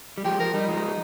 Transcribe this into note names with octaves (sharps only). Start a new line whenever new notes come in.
G3
F3 G#3 G4
F3 A#4
G3 D#4
F3 G#3